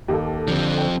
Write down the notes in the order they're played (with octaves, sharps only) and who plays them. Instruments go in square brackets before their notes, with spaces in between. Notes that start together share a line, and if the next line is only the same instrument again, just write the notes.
[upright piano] D#2 [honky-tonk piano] G4 A4
[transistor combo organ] D3 [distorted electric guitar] F3 C4
[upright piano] C5 G5